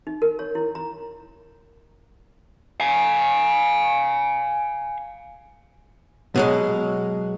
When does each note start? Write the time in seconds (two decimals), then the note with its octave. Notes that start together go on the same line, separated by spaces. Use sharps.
0.07 D#4
0.22 A#4
0.39 C#5
0.55 E4
0.75 A#5
2.80 F5 G#5
6.36 B2 F#3 G#3